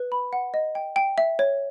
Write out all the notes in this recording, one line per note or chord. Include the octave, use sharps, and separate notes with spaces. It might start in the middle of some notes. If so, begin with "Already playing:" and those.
Already playing: B4
B5
F#5
D#5
G5
G5
E5
C#5